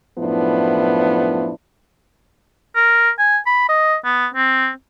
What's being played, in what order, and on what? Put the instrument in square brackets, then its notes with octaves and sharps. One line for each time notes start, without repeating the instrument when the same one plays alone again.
[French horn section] F#2 A2 F3 B3 D4 E4
[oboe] A#4
G#5
B5
D#5
B3
C4